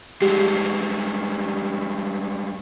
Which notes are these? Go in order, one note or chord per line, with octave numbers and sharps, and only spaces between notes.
G2 G#3 G4